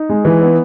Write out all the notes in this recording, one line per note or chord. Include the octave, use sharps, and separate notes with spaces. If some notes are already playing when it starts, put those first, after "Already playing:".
Already playing: D#4
G#3
E3
B3